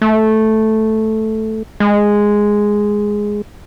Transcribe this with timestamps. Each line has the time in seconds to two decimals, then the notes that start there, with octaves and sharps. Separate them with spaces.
0.02 A3
1.80 G#3